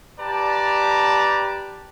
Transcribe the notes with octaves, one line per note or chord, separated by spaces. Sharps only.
G4 B4 D5 A5 A#5